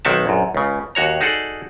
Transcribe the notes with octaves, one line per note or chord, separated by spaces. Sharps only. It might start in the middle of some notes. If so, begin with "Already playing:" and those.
B1 D#3 C4 F#4 E5 A5
A#1 F#2
C#2 C#3
D#2 F#4 C#5 A#5
D#4 F#4 G#4 A4 D5